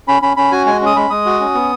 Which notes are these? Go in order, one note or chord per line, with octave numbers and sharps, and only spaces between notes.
C#4 B5
C#4 B5
C#4 B5
F#4 G#5
G#3 G#5
C#4
D#6
G#3 B5
G#3 D#6
F#4
C#4
B3